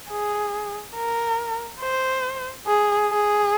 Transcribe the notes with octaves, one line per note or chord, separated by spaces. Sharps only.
G#4
A#4
C5
G#4
G#4